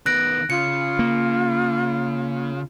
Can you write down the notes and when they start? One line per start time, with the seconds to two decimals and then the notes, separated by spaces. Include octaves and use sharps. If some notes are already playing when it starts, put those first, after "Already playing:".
0.06 D#3 B3 F#6 A#6 D7
0.50 C#3 F4 C#7
0.99 A#3